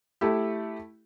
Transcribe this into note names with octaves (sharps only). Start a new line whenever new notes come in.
A3 E4 G4